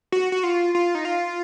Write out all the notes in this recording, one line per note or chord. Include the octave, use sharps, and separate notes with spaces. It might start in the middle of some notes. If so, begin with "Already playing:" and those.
F#4
F#4
F4
F4
D#4
F4